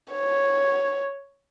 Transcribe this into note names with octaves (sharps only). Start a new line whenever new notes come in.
C#5